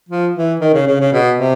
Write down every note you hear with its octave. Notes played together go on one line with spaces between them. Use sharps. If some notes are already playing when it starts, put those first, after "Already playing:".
F3
E3
D#3
C#3
C#3
C#3
B2
C3